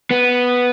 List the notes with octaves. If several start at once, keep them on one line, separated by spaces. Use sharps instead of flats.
B3